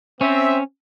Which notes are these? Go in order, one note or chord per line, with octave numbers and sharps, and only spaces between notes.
C4 C#4 E5